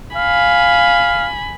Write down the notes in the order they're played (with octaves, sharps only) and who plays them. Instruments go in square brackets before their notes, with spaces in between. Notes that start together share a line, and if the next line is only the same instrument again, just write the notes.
[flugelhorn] F5 [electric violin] G#5 B5